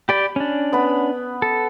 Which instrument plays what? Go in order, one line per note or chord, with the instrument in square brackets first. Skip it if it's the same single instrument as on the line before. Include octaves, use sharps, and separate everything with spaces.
[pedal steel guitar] G4 D5 G5 [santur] B5
[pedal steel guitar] C#4 D4
[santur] B3 B5
[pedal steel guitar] A4